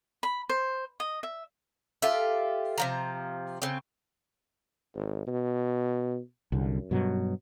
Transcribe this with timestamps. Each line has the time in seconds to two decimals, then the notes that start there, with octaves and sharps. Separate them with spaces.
0.23 B5
0.49 C5
1.00 D#5
1.23 E5
2.02 F4 G4 A4 E5
2.78 C3 F3 A#5
3.62 C#3 C4
4.95 G#1
5.27 B2
6.52 C2 F#2 D3
6.91 G2 B2 F#3